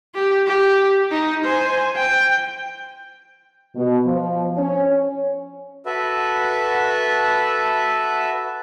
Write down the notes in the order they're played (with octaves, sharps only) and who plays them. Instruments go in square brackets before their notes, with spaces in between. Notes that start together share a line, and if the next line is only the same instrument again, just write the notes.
[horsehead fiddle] G4
G4
D#4
C5 G#5
G5
[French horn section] B2
F3
C#4
[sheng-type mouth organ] F#4 A4 B4 E5